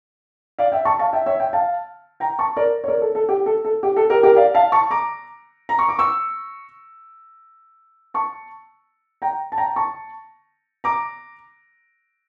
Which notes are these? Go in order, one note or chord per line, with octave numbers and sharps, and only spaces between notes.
D5 F5
E5 G5
A5 C#6
F5 A5
E5 G5
C#5 E5
E5 G5
F5 A5
G5 A#5
A5 C#6
A#4 D5
C#5
A#4 D5
A4
A4
G4
A4
A4
G4
A4
G4 A#4
G4 A#4
D5 F5
F5 A5
A5 C#6
A#5 D6
A#5
C#6
D6
C#6 E6
A5 C#6
G5 A#5
A5
G5 A#5
A5 C#6
A#5 D6